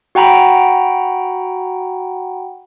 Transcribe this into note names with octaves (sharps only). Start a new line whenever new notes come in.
F#4 F#5 G5 A#5 B5